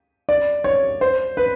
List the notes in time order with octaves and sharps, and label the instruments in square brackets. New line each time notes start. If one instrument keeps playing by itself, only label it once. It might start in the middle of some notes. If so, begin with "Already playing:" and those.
[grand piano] D5
C#5
C5
B4